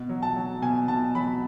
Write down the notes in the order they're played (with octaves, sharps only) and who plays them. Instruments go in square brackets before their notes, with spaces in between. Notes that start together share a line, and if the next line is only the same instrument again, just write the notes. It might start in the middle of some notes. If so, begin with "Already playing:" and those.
Already playing: [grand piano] B2
F#3
A5
F#3
B2 G#5
B2 A5
F#3 B5